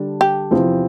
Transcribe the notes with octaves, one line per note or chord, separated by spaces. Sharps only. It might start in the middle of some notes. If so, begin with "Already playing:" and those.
Already playing: D3 G3 D4
G4
E2 C3 F3 C4